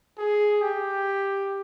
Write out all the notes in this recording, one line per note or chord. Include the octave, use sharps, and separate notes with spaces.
G#4
G4